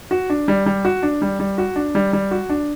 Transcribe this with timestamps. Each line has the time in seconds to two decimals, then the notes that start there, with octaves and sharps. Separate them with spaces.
0.11 F#4
0.30 D4
0.48 G3
0.66 G3
0.85 F#4
1.03 D4
1.22 G3
1.40 G3
1.58 F#4
1.76 D4
1.95 G3
2.13 G3
2.31 F#4
2.49 D4